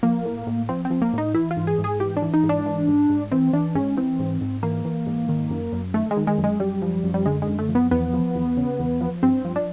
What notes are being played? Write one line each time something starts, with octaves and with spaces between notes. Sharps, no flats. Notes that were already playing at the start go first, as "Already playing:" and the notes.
F3 A#3
A2
A2
F3 C4
C4
F3
A#3
A2 D#4
E3 E4
F4
G#2
G#4
G#2
G#4
E3 G4
D4
E3
D#4
G#2
D4
E3
G#2
G#2
E3 C4
E3 D4
G#2 C#4
E3 C4
G#2
G#2
E3 A#3
E3
G#2
D#3
F#2
F#2
D#3 A3
G#3
D#3
G#3
F#2
G#3
F#2 G3
F3
F#2
G3
D3 G#3
G#3
F#2
A3
F3
B3
E2 B3
F3
E2
C#3
E2
F3
G2 C4
F3
D4